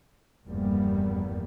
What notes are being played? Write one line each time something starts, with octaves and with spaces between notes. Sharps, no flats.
F1 E2 G2 G3 A#3 B3